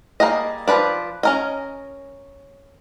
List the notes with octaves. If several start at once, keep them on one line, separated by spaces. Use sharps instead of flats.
G3 A#3 F#4 G#4 D#5
F3 F#3 B4 D5
C#4 A#4 D#5